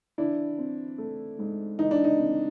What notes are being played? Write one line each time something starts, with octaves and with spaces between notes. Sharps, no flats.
E3 D4 E4
C4
A3
G#2
E3 D#4
D4
D#4
C4